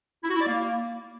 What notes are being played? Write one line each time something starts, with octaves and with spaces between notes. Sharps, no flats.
E4
F#4
E4
D5
A#3